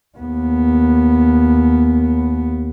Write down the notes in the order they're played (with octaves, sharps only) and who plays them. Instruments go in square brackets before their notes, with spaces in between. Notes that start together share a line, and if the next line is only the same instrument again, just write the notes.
[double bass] D#2 B3